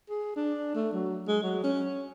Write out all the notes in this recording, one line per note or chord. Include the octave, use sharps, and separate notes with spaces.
G#4
D4
A3
F#3
G#3
F#3
C#4